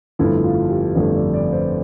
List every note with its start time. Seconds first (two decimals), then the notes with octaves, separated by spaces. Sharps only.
0.19 G1 F2 D3 F3 A3 E4
0.44 F4
0.70 G4
0.95 G1 F2 D3 F3 A3 D5
1.15 D5
1.34 D5
1.52 C5